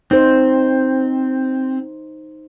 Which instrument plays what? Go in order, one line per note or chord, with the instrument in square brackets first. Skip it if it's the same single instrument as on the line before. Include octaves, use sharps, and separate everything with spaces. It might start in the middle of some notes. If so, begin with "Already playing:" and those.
[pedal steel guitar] C4 [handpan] D#4 C5